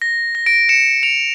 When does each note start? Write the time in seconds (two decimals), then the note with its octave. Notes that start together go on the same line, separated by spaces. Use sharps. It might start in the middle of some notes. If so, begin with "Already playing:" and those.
0.02 A#6
0.35 A#6
0.46 A#6 D7
0.69 C#7 E7
1.03 D7 F7